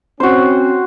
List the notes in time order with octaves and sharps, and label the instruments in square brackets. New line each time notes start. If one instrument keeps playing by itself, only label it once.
[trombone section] C4 C#4 [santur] F#4 C5